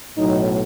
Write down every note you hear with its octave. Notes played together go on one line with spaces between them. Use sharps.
B1 A2 F#3 D#4